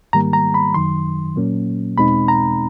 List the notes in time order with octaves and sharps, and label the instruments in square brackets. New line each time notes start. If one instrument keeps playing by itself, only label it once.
[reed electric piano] G#2 D#3 G3 A#3 A#5
A#5
B5
F#2 D#3 F#3 C6
A#2 F#3 A#3 C#4
E2 B2 G#3 C4 D#4 B5
A#5